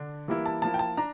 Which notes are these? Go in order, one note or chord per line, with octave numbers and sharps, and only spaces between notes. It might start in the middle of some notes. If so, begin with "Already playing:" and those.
Already playing: D3 D4
E3 G3 A#3 E4
A5
F3 A#3 E4 A5
G5
A5
D4 A#5